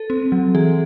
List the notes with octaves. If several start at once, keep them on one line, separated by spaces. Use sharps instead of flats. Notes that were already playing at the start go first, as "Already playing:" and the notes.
Already playing: A4
C4
F#3
E3 G#4